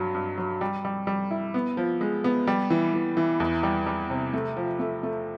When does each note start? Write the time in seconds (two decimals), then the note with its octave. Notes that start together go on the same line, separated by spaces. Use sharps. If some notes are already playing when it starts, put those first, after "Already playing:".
Already playing: G2 F#3
0.14 G2
0.38 F#3
0.61 G3
0.85 G3
1.07 G3
1.31 E4
1.54 B3
1.77 F3
2.01 G#3
2.24 B3
2.47 G3
2.70 E3
2.94 E3
3.17 E3
3.40 E2
3.63 G3
3.86 G3
4.10 C3
4.33 A3
4.57 F3
4.80 A3
5.03 A3